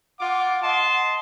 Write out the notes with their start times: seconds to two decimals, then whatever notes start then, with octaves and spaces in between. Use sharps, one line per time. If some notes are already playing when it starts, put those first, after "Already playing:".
0.20 F4 F#5 D6
0.62 D#5 A5 C6